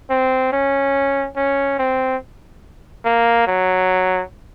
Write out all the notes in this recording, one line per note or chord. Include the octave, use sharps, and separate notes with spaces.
C4
C#4
C#4
C4
A#3
F#3